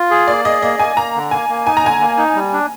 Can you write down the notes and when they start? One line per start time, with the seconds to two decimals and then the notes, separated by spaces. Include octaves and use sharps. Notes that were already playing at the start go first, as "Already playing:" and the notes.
Already playing: F4
0.11 G#4
0.28 A#3 D5
0.45 G#4 D#5
0.62 A#3 D#5
0.79 A#3 G#5
0.96 A#3 A#5
1.15 D3
1.31 A#3 G#5
1.49 A#3
1.66 D#4 G#5
1.77 A#5
1.83 D3 G#5
2.01 A#3
2.17 D#4
2.35 G3
2.53 D4